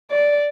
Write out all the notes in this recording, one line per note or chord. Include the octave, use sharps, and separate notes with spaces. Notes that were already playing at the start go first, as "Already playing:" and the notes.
D5